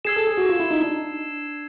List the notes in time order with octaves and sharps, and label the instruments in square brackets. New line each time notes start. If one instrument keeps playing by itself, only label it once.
[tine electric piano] G#4 [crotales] E6 G#6 C7 E7
[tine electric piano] A4
G#4
F#4
F4
E4
D#4
D4